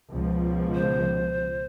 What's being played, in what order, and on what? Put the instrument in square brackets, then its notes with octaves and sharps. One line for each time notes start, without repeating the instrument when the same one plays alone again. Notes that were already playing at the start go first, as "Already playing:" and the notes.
[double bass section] C#2 B2 F3
[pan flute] C5